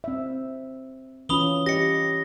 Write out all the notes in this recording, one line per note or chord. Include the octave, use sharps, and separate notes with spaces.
C4 E5
E3 C#4 F4 B5 D#6 G7
G4 D#5 A#6 C#7